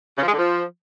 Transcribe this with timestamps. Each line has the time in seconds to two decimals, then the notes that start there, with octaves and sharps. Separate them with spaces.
0.18 C#3
0.23 F3
0.28 G#3
0.33 D3
0.39 F3